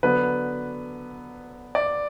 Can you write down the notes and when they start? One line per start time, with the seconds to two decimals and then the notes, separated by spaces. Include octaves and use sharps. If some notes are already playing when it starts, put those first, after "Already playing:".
0.03 D3 F#3 B3 B4
1.75 D5